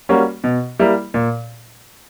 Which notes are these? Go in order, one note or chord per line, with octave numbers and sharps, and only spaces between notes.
G3 A#3 C#4 F#4
B2
G3 A#3 E4
A#2